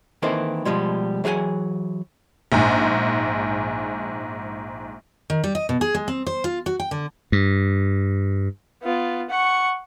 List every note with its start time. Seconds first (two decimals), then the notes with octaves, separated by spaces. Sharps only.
0.22 D#3 E3 A#3 C4 E4 A4
0.65 B2 F3 G3 G#3
1.24 E3 F#3 G#4 F#5 G#5
2.52 A#1 G#2
5.30 D#3
5.44 G3
5.55 D#5
5.69 B2
5.81 G#4
5.95 G#3
6.08 C4
6.26 C5
6.44 F4
6.66 F#4
6.80 G5
6.91 D3
7.32 G2
8.82 B3 F4
9.30 F#5 C#6